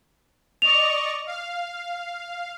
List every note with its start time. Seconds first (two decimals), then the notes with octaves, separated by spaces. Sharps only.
0.62 D5 D#5 C#6 F7
1.27 F5